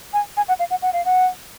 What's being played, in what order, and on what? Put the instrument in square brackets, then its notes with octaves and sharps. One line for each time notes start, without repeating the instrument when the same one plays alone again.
[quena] G#5
G#5
F#5
F5
F#5
F#5
F5
F#5